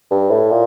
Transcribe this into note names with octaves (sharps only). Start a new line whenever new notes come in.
G2
A2
A#2